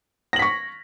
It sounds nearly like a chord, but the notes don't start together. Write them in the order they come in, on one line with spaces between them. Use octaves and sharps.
A#6 F#7 B6 C#6